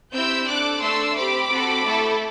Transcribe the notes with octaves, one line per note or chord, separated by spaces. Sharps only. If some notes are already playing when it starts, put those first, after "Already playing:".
C4 E4 G4 E6 G6
D4 A4 D6 F#6
A3 D4 A4 C6 E6
C4 G4 B5 D6
C4 F#4 A4
A3 E4 A4